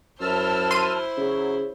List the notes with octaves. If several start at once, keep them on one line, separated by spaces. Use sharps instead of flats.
F#2 E4 C5 A5 E6 F6
C6 D#7
C#3 F#3